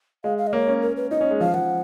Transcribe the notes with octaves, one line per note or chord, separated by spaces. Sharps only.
G#3 F5
F5
D#5
A#3 C#5
C#4
A#4
B4
D#4 D#5
C#4
G#3
F3 F5
F3 F#5